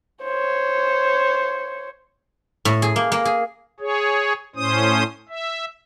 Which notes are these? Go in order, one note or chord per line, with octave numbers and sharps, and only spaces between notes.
C5 C#5
A2
G#4
A#3
A#3
G#4
G#4 C#5
A2 C#4 C5 D#6
E5